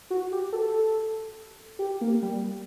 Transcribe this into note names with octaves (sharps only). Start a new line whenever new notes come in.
F#4
G4
A4
G4
A#3
G3